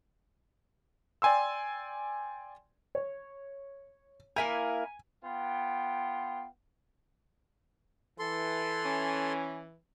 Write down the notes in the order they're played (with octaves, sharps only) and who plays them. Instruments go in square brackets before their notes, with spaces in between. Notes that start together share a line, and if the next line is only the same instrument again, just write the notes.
[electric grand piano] D5 G5 G#5 C6 E6
[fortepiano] C#5
[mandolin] A#3 E4 A#4 [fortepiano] G#5
[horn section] B3 F4 G5
[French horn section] E3 [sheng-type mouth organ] A4 C6
[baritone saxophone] C#4